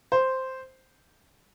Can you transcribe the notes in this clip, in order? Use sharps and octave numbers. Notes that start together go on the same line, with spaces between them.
C5